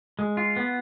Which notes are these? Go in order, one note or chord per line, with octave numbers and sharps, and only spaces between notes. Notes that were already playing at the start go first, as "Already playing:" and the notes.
G#3
F4
B3